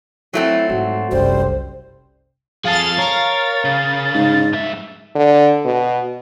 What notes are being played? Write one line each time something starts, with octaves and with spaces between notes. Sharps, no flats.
F#3 A3 C4 E4
G#2 G#3 F#4
F#1 C2 G3 C5
F3 G#4 A4 F5 A6
A#4 C#5
C#3
G#2
G2 E5
D3
B2